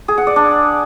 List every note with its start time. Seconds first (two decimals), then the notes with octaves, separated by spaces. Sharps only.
0.08 G#4
0.18 F#5
0.27 D5
0.36 D4